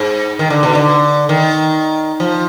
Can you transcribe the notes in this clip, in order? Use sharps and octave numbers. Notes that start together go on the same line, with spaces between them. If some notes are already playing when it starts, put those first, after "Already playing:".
Already playing: G#2
D#3
D3
B2
D3
D#3
F3